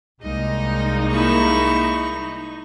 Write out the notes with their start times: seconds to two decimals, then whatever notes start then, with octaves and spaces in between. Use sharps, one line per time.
0.23 C2 G3 G#3 A#3 D#4 D#5
1.11 E4 C#6